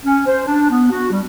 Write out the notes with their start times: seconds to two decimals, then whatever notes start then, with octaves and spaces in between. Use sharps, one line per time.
0.05 C#4
0.27 C5
0.47 D4
0.70 B3
0.91 F#4
1.12 G3